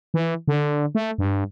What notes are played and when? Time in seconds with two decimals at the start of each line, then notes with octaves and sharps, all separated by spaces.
0.14 E3
0.48 D3
0.95 A3
1.18 G2